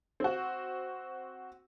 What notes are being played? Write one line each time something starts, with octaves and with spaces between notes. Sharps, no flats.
C4 F#4